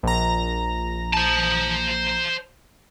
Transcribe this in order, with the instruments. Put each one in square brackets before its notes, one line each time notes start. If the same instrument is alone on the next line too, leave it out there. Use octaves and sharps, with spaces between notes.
[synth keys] A#1 A#5
[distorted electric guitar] C5 A5